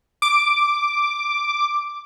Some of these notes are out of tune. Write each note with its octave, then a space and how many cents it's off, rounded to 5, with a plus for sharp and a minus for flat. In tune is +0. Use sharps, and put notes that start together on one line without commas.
D6 +0